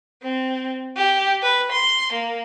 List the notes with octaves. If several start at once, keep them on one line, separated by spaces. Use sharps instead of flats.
C4
G4
B4
C6
A#3